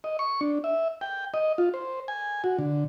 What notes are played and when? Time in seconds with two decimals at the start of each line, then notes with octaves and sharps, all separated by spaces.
0.04 D#5
0.19 C#6
0.41 D4
0.64 E5
1.01 G5
1.34 D#5
1.58 F4
1.74 C5
2.08 G#5
2.44 F#4
2.58 D3